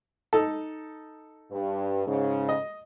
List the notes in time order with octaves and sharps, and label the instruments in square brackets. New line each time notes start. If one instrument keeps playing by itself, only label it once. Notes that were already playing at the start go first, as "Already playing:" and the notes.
[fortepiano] D#4 A4
[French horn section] G2
G#2 C#3
[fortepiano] D#5